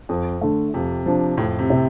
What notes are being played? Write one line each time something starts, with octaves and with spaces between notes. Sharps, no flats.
F2
D3 A3
F2 C3
F3 D4
F2 A2
C3
C3